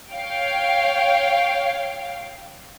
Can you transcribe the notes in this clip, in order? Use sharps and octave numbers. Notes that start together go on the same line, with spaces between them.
C#5 F5 G5